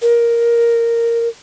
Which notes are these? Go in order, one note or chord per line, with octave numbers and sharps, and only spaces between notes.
A#4